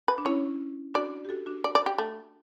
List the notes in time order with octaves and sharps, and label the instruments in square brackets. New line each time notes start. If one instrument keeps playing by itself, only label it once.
[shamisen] B4
[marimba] D4
[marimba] C#4 E4 [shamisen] C#5
[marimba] D4 F#4 [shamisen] D5
[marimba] G4
F#4 A4
D4 F#4
[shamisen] D5
D5
G4
A3